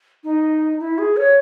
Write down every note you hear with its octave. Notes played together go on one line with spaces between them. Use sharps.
D#4
E4
G#4
C#5